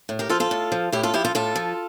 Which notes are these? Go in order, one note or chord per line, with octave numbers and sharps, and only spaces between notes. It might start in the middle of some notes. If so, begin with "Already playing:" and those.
A2
G4 A#4
F3 F4 A4
F4 A4
A2
F3
A2 E4 G4
F4 A4
F3 E4 G4
F4 A4
A2 F4 A4
F3